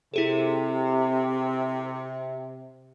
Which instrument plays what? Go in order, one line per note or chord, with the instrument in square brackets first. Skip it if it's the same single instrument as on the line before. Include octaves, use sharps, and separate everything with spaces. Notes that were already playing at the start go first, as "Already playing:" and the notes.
[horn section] C3 [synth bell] E4 G#4 A4